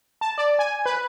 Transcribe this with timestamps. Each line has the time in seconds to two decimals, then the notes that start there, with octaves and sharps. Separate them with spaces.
0.21 A5
0.38 D5
0.59 G#5
0.86 B4